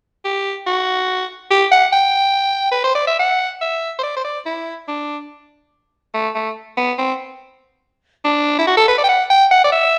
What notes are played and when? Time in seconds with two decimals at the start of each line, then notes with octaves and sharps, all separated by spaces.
0.25 G4
0.67 F#4
1.51 G4
1.72 F#5
1.93 G5
2.72 B4
2.84 C5
2.95 D5
3.07 E5
3.19 F#5
3.62 E5
3.99 C5
4.03 D5
4.17 C5
4.25 D5
4.46 E4
4.88 D4
6.14 A3
6.35 A3
6.77 B3
6.98 C4
8.25 D4
8.59 E4
8.67 F#4
8.77 A4
8.88 B4
8.98 D5
9.04 G5
9.09 F#5
9.30 G5
9.51 F#5
9.64 D5
9.72 E5